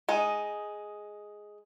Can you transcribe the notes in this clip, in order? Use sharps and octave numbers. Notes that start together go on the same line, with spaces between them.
G#3 D#4